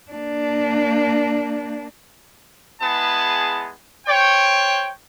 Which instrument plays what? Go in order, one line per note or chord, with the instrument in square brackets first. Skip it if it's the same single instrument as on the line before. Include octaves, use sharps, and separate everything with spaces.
[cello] A#3 D4
[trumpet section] G#3 B3 E4 G#4 A5
C5 C#5 G5